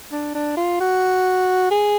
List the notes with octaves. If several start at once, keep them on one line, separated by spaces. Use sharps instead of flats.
D4
D4
F4
F#4
G#4